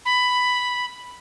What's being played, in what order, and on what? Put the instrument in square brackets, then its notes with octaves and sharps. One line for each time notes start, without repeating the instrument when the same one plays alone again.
[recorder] B5